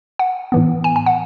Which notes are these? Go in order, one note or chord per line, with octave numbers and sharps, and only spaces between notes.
F#5
A2 E3 B3
G#5
G#5
F#5